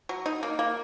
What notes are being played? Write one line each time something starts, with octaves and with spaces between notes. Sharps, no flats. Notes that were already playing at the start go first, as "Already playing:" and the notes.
F#3
D#4
A#3
A#3